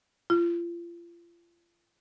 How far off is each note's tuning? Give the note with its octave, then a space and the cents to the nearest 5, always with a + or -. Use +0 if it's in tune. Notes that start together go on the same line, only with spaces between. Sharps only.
F4 -35